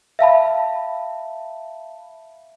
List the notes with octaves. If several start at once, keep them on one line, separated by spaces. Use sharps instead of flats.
E5 F5 A5 B5